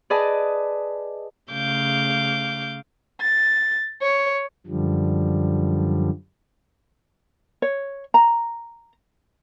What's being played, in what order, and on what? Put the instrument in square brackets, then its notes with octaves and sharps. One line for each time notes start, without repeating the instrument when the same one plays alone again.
[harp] G#4 B4 D5 D#5 A5
[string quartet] C#3 A3 F5 D6 G6
A6
C#5
[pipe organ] F#2 D3 F3 G3
[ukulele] C#5
A#5